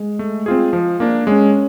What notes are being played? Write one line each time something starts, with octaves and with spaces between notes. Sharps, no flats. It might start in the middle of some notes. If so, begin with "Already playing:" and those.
Already playing: G#3
A3
C4 F4 G#4
F3
A#3 D4
G#3 C#4